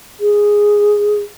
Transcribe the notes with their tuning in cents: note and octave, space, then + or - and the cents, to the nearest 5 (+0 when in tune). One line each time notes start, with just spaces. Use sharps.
G#4 -5